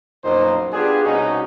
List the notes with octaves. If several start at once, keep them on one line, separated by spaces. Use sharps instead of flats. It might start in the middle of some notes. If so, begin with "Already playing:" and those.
A#1 F#2 B2 A#3 D#4 C5
B3 D4 F4 G4 G#4
C2 B2 C#4 D#4 F#4